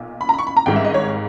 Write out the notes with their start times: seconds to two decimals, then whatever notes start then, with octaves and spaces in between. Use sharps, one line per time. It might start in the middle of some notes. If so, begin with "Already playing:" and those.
Already playing: B1 A#2
0.21 B5
0.29 A#5
0.34 B5
0.39 C#6
0.47 B5
0.57 A#5
0.66 G#1 G#2 G3 G5
0.76 E5
0.85 D#5
0.94 C#5